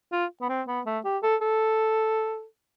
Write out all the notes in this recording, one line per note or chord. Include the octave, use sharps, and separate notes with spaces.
F4
B3
C4
B3
A3
G4
A4
A4